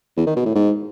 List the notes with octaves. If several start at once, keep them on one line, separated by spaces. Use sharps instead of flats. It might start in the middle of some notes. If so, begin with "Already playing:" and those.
E2
D#3
B2
A2
G#2